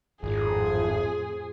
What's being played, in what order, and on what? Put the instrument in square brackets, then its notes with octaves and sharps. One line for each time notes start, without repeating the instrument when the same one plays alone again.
[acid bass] G#1 [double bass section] F2 A2 F3 [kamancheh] G#4